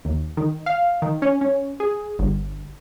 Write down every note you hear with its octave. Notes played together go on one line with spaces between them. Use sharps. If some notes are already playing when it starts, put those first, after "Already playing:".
D#2
D#3
F5
D#3
C#4
C#4
G#4
G1